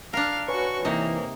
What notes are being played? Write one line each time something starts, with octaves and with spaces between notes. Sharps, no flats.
D4 A#4 F5
F#4 B4 C#5 G#5 C#6
C3 E3 A#3 D#4